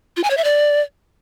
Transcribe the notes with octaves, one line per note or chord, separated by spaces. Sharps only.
F4
G#5
C#5
E5
D5